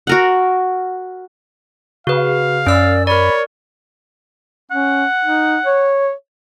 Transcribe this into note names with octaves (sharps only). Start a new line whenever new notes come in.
F#4 A#4 F#5
C#3 F#4 B4 F5
F#2 C#4 D5 E6
A#4 C#5 D5 B5
C#4 F#5
D#4
C#5